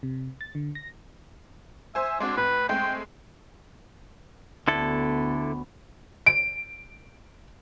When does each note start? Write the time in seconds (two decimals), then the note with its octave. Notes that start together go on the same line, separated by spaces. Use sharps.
0.03 C3
0.41 A6
0.55 D3
0.75 A#6
1.95 C5 E5 G#5
2.20 G#3 C4 D4 F#4
2.37 A2 B4
2.69 G#3 A3 C4 G5
4.68 D2 D3 B3 E4 A4
6.26 D7